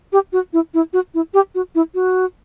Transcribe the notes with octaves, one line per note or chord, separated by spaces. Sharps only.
G4
F#4
E4
E4
F#4
E4
G4
F#4
E4
F#4